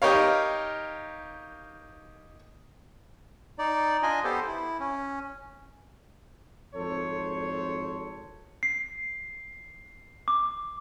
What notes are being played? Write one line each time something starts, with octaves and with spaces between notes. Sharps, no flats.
D#4 G4 A#4 C#5 F5
D#4 D5
D4 F4 D#5 G#5
B3 G4 A4 C5
E4
C#4
G#1 F2 A4 C5 C#5
C7
D6